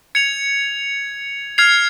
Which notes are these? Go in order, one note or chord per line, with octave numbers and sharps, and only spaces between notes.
G#6 C#7 F7
F6 G#6 C7 F7